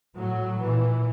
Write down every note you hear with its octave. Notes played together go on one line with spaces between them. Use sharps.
A2 F#3
A#2 E3